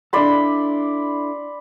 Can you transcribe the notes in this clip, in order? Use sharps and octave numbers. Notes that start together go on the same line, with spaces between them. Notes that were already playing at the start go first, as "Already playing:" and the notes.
D4 E4 A4 D5 B5 C6